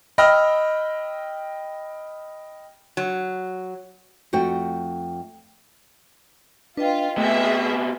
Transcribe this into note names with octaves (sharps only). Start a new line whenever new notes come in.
D#5 G5 B5 E6 F6 A#6
F#3
F2 A3 F#4 G5
D4 F4 B4 D#5 G5
C3 A3 B3 G#4 E5